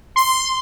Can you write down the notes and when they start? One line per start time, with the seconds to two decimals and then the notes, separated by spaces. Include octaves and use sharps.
0.16 C6